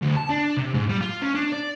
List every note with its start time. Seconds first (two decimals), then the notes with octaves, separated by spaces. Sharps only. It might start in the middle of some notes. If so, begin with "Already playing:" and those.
0.02 D2
0.17 A5
0.30 D4
0.57 C3
0.74 G#2
0.89 G3
1.01 F4
1.21 C#4
1.35 D4
1.52 D5